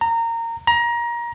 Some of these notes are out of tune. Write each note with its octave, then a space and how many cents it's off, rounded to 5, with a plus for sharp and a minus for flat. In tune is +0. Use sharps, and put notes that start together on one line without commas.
A#5 -20
A#5 +25